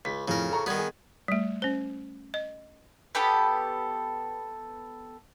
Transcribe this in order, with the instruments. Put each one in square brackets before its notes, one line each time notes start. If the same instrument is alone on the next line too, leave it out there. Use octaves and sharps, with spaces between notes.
[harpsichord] C#2 [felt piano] B6
[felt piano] F2 A2 [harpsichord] C#3 A#4
[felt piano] A4 A#5 C#6
[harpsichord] D#3 B3 [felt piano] G3 G#6
[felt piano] G#4
[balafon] G3 A3
C#4 C5
D#5
[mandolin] B3 G4 A4 B5